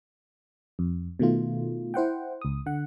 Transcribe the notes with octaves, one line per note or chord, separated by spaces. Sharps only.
F2
B2 D#3 A3 F4
E4 C5 F#5 G5
C#2 D#6
D3 F#5